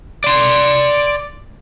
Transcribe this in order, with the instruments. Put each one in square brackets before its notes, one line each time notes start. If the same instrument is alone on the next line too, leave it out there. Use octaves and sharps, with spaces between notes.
[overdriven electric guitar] D5 C6